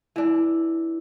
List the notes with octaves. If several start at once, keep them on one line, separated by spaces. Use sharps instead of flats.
E3 D4